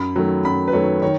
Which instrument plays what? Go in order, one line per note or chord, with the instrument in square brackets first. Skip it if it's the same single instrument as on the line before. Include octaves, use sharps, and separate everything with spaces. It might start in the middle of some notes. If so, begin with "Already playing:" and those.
Already playing: [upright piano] F#2 B5
D#3 F#3 A3
F#2 B5
B4
D#3 F#3 A3 C#5
D#3 C#5